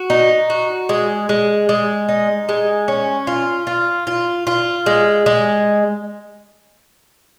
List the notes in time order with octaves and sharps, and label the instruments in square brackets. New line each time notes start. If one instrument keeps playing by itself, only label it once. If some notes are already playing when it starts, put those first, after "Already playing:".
Already playing: [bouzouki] F#4
D#4
F#4
G#3
G#3
G#3
D#4
G#3
C#4
F4
F4
F4
F4
G#3
G#3